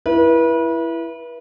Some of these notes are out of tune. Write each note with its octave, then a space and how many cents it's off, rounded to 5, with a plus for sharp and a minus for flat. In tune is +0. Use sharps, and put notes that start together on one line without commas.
E4 +15 B4 -35